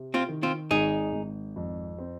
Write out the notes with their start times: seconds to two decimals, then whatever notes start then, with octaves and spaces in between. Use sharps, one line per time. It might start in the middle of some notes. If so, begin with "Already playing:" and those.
Already playing: C3
0.14 C4 F4
0.28 D#3
0.43 C4 F4
0.71 G#1 D#4 G#4
1.13 G#1
1.56 F2
1.99 C4